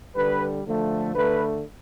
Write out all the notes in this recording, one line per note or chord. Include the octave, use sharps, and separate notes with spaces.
D3 G3 B4
D3 F3 A3
D3 A3 B4